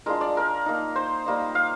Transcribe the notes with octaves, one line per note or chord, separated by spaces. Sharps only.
G#3 D4 F4 A#4
D5
A#4
A#3 D#4
C5
G3 A#3 D#4
F5